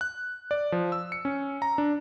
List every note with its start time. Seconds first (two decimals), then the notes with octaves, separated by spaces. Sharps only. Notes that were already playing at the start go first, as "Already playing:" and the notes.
0.01 F#6
0.51 D5
0.72 F3
0.92 E6
1.12 C#7
1.25 C#4
1.62 A#5
1.78 D4